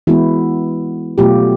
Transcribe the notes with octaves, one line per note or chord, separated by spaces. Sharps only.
E3 G#3 B3 E4 F#4
B2 F#3 A3 F4 G4